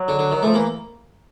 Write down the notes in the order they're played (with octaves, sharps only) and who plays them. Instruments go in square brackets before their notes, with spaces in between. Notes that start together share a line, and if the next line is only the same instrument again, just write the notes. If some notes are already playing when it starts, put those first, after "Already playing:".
Already playing: [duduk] F#3
[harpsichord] D3
D3
[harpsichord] D#3 [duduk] F#3
[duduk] F3 [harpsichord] A3
[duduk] E3 [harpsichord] A#3